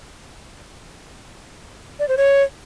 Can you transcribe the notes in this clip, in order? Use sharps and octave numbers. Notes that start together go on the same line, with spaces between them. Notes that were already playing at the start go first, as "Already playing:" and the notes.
D5
C5
C#5